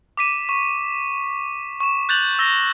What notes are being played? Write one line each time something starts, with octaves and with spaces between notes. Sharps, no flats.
D6 B6 D#7 E7
C#6
C#6 E7
F#6 G6 A6 F7 F#7
E6 A#6 G7